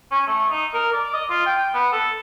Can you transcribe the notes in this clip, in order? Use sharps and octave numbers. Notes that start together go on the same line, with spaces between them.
C#4
A3
D#4
A#4
D5
D#5
F4
G5
B3
A4